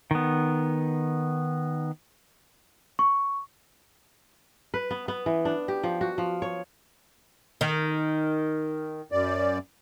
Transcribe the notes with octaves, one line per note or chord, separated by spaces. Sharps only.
D#3 B3
C#6
B4
B3
B3
E3
D4
G4
F3
F#4
F3
C#5
D#3
F#2 D5